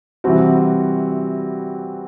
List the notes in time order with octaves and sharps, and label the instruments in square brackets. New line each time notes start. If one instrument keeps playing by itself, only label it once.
[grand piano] C3 E3 G3 C4 F#4